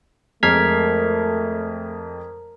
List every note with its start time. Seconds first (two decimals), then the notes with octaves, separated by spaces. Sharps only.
0.43 F2 G#3 A3 A#4 F6 G#6 B6 C7